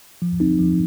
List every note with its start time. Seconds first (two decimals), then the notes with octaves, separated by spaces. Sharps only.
0.22 F3
0.40 C4 D#4
0.59 F3